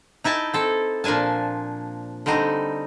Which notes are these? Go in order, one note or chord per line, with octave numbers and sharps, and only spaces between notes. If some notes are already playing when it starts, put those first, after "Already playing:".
D#4 E4 G5 A5
C4 A4
A#2 F3 D4 G#5 A5
D3 G3 C4 D#4